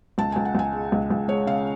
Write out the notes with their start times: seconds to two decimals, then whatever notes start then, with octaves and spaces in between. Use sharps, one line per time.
0.18 C#2 A5
0.32 C#2 G#5
0.45 F#5
0.55 C#2 G#5
0.73 G#3
0.92 C#2
1.10 C#2
1.28 G#3 C#5
1.47 C#3 F5